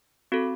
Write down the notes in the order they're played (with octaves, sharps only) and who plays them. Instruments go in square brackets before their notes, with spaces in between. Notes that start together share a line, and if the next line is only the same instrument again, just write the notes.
[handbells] C4 F#4 A4